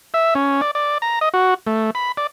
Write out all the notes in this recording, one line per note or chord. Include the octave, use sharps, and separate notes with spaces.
E5
C#4
D5
D5
A#5
D#5
F#4
A3
B5
D5